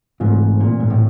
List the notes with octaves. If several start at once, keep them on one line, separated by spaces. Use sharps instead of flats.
G#2 C#3 E3 A3 C4 F4
A#2
G#2
A2